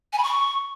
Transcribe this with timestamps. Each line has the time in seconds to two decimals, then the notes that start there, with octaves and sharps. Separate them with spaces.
0.13 G#5
0.18 B5
0.23 C#6